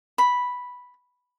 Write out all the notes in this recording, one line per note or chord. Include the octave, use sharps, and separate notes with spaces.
B5